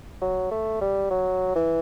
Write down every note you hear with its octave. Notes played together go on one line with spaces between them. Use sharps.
F#3
A3
G3
F#3
E3